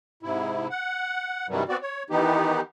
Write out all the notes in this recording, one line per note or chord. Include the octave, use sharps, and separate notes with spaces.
G#2 C3 E4
F#5
G2 C3 D#3 E3 F#3 G3
B3 C4 F#4 D5
C#5
D#3 E3 B3 D#4 G4